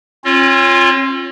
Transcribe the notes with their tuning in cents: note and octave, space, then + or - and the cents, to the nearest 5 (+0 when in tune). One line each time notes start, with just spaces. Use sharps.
C#4 -45 F4 +0 C#5 +0